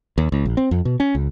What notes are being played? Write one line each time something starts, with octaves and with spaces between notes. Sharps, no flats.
D#2
C#2
A#1
C4
F2
B2
C#4
C#2